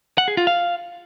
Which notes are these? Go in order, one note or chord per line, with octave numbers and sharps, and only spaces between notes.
F#5
G#4
F4
F5